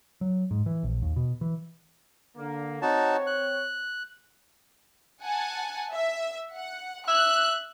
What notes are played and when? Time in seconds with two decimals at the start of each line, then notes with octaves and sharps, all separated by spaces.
0.21 F#3
0.51 G#2
0.66 E3
0.83 A#1
1.02 D#2
1.16 B2
1.41 E3
2.37 D3 A#3
2.82 C4 D#4 F#4 C#5 A5
3.27 F#6
5.23 F#5 G#5 A5
5.92 E5
6.54 F#5
7.08 E5 F#6